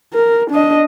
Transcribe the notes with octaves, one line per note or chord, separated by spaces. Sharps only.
A#4
D4 D#5